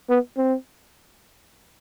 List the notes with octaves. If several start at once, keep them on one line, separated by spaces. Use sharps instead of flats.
B3
C4